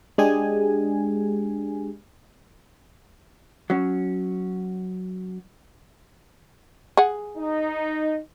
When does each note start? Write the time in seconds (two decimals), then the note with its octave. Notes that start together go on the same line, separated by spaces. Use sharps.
0.18 G#3 D4 G4 G#4 G#5
3.70 F#3 C#4
6.97 G#4 F#5
7.37 D#4